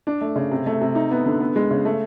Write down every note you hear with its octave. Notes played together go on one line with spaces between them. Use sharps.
D4
A3
C#3
C3
A3
C3
D#4
B3
D3
B3
G#3
C#3
A3